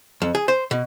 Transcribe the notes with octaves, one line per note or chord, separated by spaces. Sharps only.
F2
G#4
C5
B2